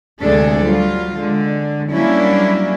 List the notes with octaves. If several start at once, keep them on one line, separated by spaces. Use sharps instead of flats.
D2 C3 G#3 D4 G#4 A4
F#3 G3 F4
D3 G#3
F#3 G3 A#3 C#4 D4 E4